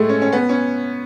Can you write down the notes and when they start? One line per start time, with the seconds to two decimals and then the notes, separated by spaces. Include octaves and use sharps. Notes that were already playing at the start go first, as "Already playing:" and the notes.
Already playing: A2 G#3 A3
0.09 C#4
0.22 C#4
0.32 B3
0.49 C#4